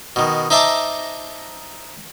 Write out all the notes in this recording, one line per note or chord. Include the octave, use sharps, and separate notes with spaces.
B2 D#3
D#4 C5 E5 A5 A#5 D6